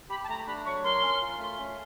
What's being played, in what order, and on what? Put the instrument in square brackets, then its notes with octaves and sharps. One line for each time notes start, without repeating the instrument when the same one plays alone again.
[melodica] G4 [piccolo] B5
[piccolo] A5
[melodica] A3 [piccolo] A#5
[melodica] D4 [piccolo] B5
[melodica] F#3 [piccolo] C#6
[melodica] A#4 [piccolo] C6
[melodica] C#4
F4
A3
C#4